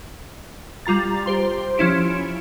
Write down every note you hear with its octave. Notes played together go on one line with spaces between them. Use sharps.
G3 F4 A#5 A6
G4 C5 C6
F3 C#4 E4 D7